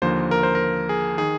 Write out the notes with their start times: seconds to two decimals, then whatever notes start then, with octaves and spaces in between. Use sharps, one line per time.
0.02 D#2 D3 F3 A#3 C5
0.31 A#4
0.43 C5
0.55 A#4
0.89 G#4
1.18 D#3 G#4